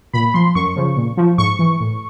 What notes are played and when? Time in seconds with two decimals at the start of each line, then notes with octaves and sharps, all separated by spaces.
0.13 A#2 B5
0.34 F3 C6
0.55 F#2 C#6
0.76 C#3 F3
0.97 A#2
1.17 F3
1.38 G#2 C#6
1.59 E3
1.80 A2